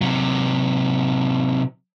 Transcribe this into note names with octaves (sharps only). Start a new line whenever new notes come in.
C3 F#3